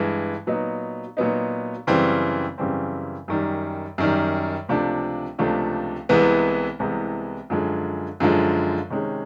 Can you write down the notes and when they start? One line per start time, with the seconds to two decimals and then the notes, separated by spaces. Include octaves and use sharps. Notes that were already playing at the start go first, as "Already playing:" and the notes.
Already playing: G2 E3 G#3
0.47 A#2 F#3 B3 D#4
1.17 A#2 F#3 B3 D#4
1.87 F#2 C#3 E3 G3 C4
2.58 F#2 C#3 E3 G3 C4
3.28 F#2 D#3 G3
3.98 F#2 D#3 G3
4.69 C#2 C3 F3 A3 D4
5.38 C#2 C3 F3 A3 D4
6.09 C2 C3 E3 G#3 B3
6.79 C2 C3 E3 G#3 B3
7.50 F#2 D3 F3 G#3
8.20 F#2 D3 F3 G#3
8.90 C3 D#3 G#3 C#4